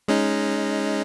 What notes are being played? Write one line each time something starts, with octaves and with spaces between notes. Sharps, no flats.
G#3 C#4 D#4